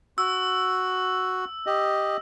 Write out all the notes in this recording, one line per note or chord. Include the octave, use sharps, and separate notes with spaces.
F#4 E6
G4 D#5